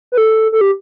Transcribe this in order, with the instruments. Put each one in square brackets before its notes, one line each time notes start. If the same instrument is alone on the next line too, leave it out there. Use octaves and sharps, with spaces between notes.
[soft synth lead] B4
A4
A4
G4